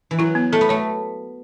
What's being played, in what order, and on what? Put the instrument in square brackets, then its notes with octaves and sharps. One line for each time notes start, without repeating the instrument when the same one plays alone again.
[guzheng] E3
[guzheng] F#3 [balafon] E4
[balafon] B3
[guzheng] A3 [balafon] A4
[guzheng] B3
[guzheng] A3 [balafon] C#5